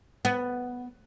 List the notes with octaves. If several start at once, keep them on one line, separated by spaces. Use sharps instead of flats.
B3